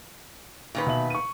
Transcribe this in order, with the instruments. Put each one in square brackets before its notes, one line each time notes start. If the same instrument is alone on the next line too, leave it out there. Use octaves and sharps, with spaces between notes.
[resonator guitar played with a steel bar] A#2 D#3 B4
[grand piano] B2 E5 F#7
C#6 D#7